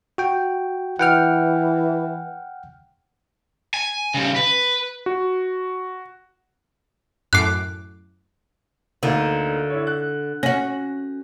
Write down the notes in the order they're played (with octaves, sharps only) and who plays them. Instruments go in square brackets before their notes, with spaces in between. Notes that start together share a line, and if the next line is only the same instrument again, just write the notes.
[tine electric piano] F#4 G5
[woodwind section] E3 [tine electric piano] F#5 G5 F6
[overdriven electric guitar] G#5
C#3 G3
B4
[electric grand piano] F#4
[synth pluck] F#2 A2 D6 [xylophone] F#6 C7
[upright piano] D2 A#3 D#4 [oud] D3
[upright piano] E4 C#5
F#6
[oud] C#4 F#4 [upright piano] A#6